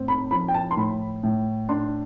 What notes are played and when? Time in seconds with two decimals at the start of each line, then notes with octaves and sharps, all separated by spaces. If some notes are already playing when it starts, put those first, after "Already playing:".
Already playing: A2 C4
0.08 B5
0.31 F3 B5
0.48 G5
0.54 A5
0.71 C6
0.77 A2 B5
1.23 A2
1.69 D4 C6